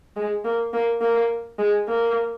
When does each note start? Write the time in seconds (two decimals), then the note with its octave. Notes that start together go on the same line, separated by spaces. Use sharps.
0.16 G#3
0.44 A#3
0.73 A#3
1.01 A#3
1.59 G#3
1.87 A#3